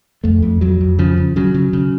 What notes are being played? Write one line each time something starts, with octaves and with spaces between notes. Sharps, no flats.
F2 A3
F2
F2 F#3
F2
C#3 F3
C#3
C#3 F#3
C#3
C#3